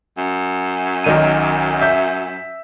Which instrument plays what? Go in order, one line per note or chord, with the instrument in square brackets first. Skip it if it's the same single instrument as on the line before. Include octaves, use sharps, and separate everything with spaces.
[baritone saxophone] F#2
[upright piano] B1 D#3 D#7
E5 G6